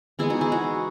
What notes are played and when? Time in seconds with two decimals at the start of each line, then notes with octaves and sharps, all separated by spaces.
0.19 E3 G#3 B3 E4 G#4
0.30 D#4 F#4
0.41 E4 G#4
0.52 D#4 F#4